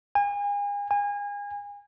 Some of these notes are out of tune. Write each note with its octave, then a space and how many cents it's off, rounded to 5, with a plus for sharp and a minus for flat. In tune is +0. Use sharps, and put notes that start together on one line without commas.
G#5 -35
G#5 -30